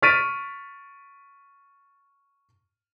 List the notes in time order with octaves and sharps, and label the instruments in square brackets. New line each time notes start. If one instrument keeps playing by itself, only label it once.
[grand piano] C#6 F6 A6 B6 D7 D#7